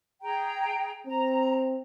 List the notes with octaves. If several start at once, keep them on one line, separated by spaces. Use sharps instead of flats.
G#4 G5 A#5
C4 A#5